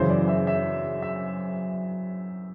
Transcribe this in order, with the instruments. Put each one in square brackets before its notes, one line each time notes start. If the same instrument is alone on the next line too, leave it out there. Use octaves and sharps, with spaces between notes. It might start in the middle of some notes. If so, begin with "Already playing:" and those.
Already playing: [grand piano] F#2 C#3 E3 C5
D5
E5
E5
E5